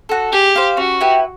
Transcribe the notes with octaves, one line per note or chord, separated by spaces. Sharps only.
F#4 A4
G4 G#4
C5 F5
C#4 F#4
E4 G4 B4